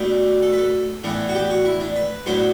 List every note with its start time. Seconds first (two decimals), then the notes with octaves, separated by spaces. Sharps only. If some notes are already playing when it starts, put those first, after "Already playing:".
Already playing: B2 A3 D4 G4
0.42 A4
0.53 B4
0.58 A4
1.04 A2 E3 B3 D4
1.29 F#4
1.35 G4
1.50 F#4
1.65 E4
1.80 D4
1.96 B4
2.26 A2 F#3 B3 D4 C5